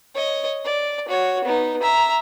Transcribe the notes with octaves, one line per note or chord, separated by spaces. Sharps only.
C#5 D#5
D5
F#4 C#5
B3 D#4
E5 A#5